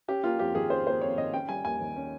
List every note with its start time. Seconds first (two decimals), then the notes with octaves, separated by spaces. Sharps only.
0.08 C#4 G4
0.24 A#3 F4
0.39 F2 G4
0.55 D#3 G#4
0.70 C#4 C5
0.87 A#3 C5
1.01 F2 C#5
1.17 D#3 D#5
1.33 C#4 G5
1.49 G3 G#5
1.64 D#2 G#5
1.81 D#3
1.96 C#4